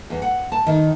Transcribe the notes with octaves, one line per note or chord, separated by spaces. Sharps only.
E2
F#5
A5
D#3